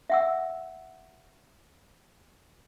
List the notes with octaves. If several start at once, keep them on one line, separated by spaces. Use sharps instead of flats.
E5 F#5 E6